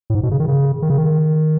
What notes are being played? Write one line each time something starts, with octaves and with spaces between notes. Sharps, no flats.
A2
G#2
B2
C#3
D#3
C#3
D#3
C#3
D#3